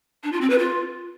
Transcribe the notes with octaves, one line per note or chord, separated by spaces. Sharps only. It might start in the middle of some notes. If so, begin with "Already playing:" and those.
D4
F4
C4
B4
F4